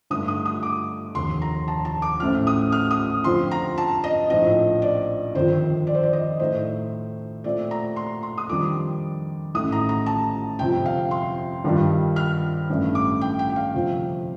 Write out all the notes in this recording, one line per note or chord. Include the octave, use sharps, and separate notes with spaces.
G2 D3 A3 D#4 D#6
D#6
D#6
D6
F1 D#2 D3 C6
A#5
A5
A5
D6
A1 A2 A3 C4 F6
D#6
F6
D#6
F2 D3 F3 C4 F4 C6
A#5
A5
D#5
A#1 A2 F3 C4 D#4 D#5
D5
G1 F2 D#3 C5
D5
C5
D5
D#5
A2 A3 D#4 C5
A#2 A3 C4 D5
A#5
C6
C6
D#6
F2 D#3 G3 D4 F4 D6
A1 A2 A3 D#4 D#6
A#5
A#5
A5
G1 F2 C3 G5
F5
C6
G2 D#3 G3 D4 F4
F6
A1 G2 D3 A3 D4
D6
G5
G5
G5
F5
G1 F2 C3 F3